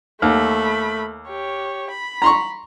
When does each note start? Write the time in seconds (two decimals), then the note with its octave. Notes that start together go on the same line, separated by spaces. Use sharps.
0.22 D#2 A3 B5
1.29 G4 C#5
1.90 B5
2.22 A#5 C6 C#6